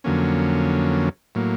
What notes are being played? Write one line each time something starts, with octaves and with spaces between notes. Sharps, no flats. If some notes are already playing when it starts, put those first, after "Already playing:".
F2 D3 F#3 A#3 C#4
A2 F#3 A#3